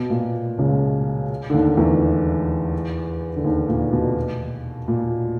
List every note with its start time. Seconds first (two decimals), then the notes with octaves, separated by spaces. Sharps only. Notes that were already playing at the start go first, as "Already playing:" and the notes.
Already playing: B2
0.10 A#2
0.58 C#2 C#3
1.50 D3
1.53 D#2 D#3
1.77 E2 E3
3.36 D3
3.44 D#2 D#3
3.69 A#2
3.93 B2
4.88 A#2